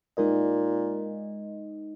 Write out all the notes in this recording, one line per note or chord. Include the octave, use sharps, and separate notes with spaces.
A#2 G#3 D#4 A#4 D#5